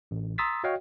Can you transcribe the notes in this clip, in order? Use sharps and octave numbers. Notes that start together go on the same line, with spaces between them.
A1
A#5 C6 D#6 E6 A6 B6
F#4 C#5 D#5 F5 G5